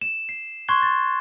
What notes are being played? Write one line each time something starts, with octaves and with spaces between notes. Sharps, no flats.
E7
C7
C6 C#6 F#6 G#6 C7 G7
A6